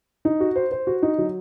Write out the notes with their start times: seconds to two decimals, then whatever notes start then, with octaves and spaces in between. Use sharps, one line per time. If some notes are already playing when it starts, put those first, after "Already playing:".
0.25 D#4
0.40 F#4
0.56 C5
0.72 C5
0.87 F#4
1.03 D#4
1.18 F#3